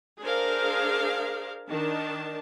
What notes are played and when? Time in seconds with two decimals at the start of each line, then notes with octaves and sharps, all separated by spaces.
0.20 D4 G#4 A#4 C5 F5
1.69 D#3 D4 A5